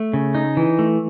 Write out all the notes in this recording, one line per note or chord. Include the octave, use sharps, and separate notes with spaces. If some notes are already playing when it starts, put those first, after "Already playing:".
Already playing: A3
C#3
D#4
E3
A3